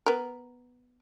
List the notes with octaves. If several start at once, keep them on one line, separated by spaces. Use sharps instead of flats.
B3 A#4